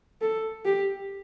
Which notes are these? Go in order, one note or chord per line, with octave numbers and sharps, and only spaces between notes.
A4
G4